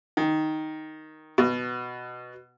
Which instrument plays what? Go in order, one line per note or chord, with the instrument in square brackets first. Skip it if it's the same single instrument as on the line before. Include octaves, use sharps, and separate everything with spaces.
[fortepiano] D#3
B2